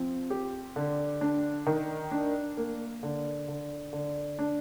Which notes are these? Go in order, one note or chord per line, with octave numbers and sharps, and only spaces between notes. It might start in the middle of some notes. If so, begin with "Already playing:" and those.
Already playing: F3 C4
G4
D3
D4
D#3
D4
A#3
D3
D3
D3
D4